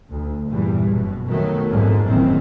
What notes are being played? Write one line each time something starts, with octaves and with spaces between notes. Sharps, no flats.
D2
E2 G2 A#2 E3 G3
F#1 B2
D#3 F#3 A3 B3
F2 G#2 D3 G#3
F#1 F2 A2 D#3 E3 C4